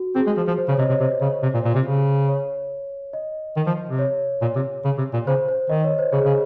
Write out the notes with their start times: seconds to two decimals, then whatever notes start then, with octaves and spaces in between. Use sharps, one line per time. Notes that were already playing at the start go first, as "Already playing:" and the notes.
Already playing: F#4
0.15 C4 G#4
0.27 G#3
0.37 F3
0.47 F3
0.58 C5
0.69 C#3 C#5
0.79 C3 D#5
0.89 C3 C#5
1.00 C3 C5
1.21 C#3
1.43 C3
1.54 A#2
1.65 A#2
1.75 C3
1.86 C#3
2.28 C#5
3.13 D#5
3.56 D#3
3.67 F3
3.89 C3
3.99 C#5
4.42 A#2
4.56 C3
4.85 C#3
4.98 C3
5.13 A#2
5.27 C#3 C5
5.48 C5
5.70 D#3 D#5
5.84 C#5
5.99 C5
6.12 C#3 G#4
6.25 C#3